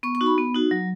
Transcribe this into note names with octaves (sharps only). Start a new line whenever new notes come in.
B3 C#6
C#6
D#4 F#4
B5
B3
D#4 F#4
F#3